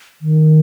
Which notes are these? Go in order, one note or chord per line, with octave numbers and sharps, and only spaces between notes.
D#3